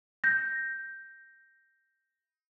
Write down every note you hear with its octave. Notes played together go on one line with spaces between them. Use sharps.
G6 A#6